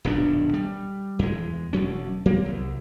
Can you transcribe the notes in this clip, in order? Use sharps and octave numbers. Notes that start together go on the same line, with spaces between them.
D#1 B1 G2 D4
G3
E2 G#3
E1 D2 F#3 C#4
F#3 A#3 C4
C2